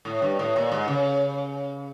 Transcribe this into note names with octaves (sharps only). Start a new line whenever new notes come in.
A2
G2
A2
A#2
G#2
C#3